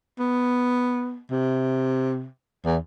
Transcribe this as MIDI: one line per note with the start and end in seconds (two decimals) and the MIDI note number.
0.19 1.19 59
1.30 2.27 48
2.65 2.77 40